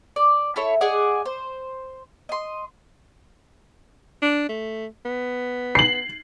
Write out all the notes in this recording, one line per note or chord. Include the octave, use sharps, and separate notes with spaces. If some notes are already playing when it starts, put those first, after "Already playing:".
D5
E4 A4 C#5
G#4 D5 D#5 F#5
C5
D#5 C6
D4
A3
B3
C7 F#7